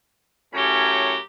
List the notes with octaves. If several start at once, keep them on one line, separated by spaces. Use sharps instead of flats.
F#2 A2 C#4 G4 C#5 A#5